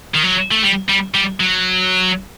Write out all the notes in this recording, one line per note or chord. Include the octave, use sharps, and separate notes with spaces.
D#3
F#3
A3
G3
G3
G3
F#3